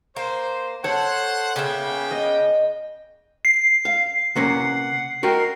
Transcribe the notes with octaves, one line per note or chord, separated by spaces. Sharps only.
A#3 C5
A4 C5 C#5 F#5
C#3 A#3 B3 E5 G5
D#5
C7
F5
C3 A#3 C#4 F#5
F#4 A#4 D#5 G5